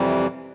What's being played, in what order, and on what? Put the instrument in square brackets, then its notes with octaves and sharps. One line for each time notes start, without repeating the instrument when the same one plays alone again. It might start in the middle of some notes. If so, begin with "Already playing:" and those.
Already playing: [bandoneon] F2 C3 E3 G3